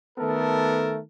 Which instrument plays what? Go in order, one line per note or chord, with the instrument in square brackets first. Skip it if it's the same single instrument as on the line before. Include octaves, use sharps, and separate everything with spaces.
[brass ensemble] D#3 A3 B3 A4 A#4 A5